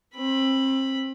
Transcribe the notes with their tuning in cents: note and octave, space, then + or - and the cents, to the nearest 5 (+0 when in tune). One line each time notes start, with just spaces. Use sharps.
C4 +30 B5 -5